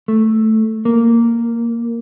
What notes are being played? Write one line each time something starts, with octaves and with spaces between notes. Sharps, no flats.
A3
A#3